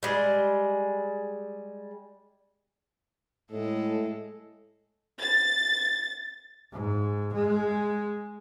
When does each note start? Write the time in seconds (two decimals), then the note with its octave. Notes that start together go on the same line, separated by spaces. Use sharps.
0.03 G3 G#3
3.51 A2 G#3 A4
5.20 A6
6.72 G#2
7.33 G#3